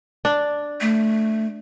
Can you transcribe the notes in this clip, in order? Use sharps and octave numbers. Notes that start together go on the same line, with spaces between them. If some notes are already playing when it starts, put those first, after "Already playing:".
D4
A3